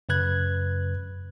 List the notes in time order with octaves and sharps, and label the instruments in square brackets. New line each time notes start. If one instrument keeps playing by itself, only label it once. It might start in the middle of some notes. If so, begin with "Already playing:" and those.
[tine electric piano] F#2 C#3 B4 F#6 G#6